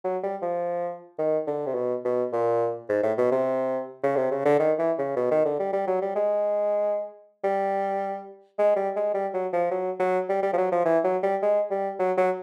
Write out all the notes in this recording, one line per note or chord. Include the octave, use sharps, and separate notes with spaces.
F#3
G3
F3
D#3
D3
C3
B2
B2
A#2
G#2
A2
B2
C3
C#3
C3
C#3
D3
D#3
E3
C#3
B2
D#3
D3
G3
G3
F#3
G3
G#3
G3
G#3
G3
G#3
G3
F#3
F3
F#3
F#3
G3
G3
F3
F#3
F3
E3
F#3
G3
G#3
G3
F#3
F#3